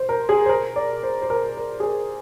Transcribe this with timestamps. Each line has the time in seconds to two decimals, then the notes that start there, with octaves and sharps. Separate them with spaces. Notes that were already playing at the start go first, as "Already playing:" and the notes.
Already playing: C5
0.09 A#4
0.29 G#4
0.46 C5
0.49 A#4
0.76 D5
1.03 C5
1.22 C5
1.30 A#4
1.57 A#4
1.80 G#4
1.83 A#4